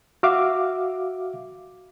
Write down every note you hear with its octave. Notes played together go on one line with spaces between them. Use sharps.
F#4 E5 F5 D6